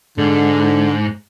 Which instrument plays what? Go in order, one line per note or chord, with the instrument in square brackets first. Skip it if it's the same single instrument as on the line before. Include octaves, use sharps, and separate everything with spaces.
[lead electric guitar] G#2 [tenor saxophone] D3